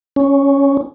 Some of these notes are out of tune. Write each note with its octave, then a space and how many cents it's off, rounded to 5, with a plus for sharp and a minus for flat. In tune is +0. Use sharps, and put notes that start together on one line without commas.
C#4 +0